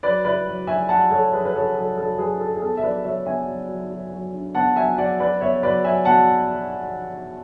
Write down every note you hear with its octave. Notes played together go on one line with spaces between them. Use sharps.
F#3 B4 D5
E4 B4 D5
F#3
F#3 E5 G#5
F#3 F#5 A5
F#3 A4 C#5
F#3 G#4 B4
B4
F#3 A4 C#5
F#3 A4
F#3 A4
F#3 G#4 B4
E4 A4
G#4
B3 A4
E5
F#3 B4 D5
F#3 C#5 E5
B3 E5 G#5
F#3
F#3
F#3
F#3
D4
B3 F#5 A5
F#3 E5 G#5
F#3 D5 F#5
F#3 B4 D5
B3 C#5 E5
F#3 B4 D5
F#3 E5 G#5
B2 F#5 A5